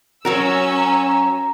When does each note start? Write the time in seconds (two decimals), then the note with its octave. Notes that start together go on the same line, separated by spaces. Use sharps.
0.25 F#3 C#4 F#4 A#4 E6
0.77 A#5